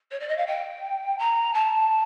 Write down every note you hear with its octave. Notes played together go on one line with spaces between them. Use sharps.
C#5
D5
D#5
F5
G5
A#5
A5